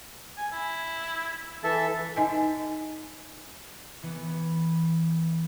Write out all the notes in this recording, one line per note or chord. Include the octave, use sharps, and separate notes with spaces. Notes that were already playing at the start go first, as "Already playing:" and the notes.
G#5
E4
E3 A4 E5 A5
D#4 D#5 G#5
E3 B3